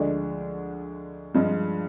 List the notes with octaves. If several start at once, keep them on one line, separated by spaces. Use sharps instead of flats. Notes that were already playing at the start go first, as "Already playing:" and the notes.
Already playing: D2 D3 F3 G#3 D4
G2 F3 G#3